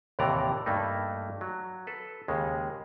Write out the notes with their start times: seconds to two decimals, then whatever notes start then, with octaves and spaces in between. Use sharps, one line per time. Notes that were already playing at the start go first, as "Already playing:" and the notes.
0.19 D#2 A2 C3 E3 D5 A#5
0.66 G2 A3 A#3 D#4
1.41 F#3
1.87 A4 B4
2.28 D#2 C#3 G#3